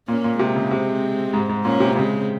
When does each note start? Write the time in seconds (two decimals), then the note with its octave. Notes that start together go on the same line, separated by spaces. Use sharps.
0.08 A#2 A#3 C#4
0.24 A#2
0.39 C3 G#3 C4
0.55 C#3
0.71 C3
1.33 G#2
1.49 G#2
1.65 A#2 A#3 C#4
1.80 C3
1.96 C#3 G#3 C4